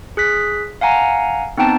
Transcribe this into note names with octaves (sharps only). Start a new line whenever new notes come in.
G#4 F#6 B6
F5 F#5 G#5 A#5
B3 C4 D#4 G5 A5